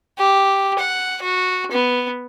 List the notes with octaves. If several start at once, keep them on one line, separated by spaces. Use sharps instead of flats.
G4
F#5
F#4
B3